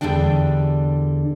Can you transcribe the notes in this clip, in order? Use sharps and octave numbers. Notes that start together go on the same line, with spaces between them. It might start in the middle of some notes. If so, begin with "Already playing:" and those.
E2 G#2 D3 G3 D4 G5